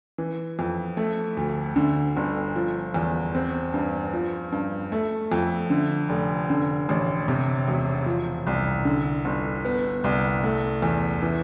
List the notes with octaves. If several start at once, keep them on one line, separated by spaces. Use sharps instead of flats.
E3
F2
A3
D2
D3
G1
F3
E2
C4
G2
F3
G2
A3
F2
D3
F1
D3
A1
C3
E1
F3
C2
D3
G1
B3
C2
A3
E2
E3